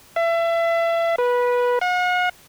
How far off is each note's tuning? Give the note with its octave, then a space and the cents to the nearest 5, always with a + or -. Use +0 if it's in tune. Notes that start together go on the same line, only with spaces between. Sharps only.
E5 +30
B4 -15
F#5 -40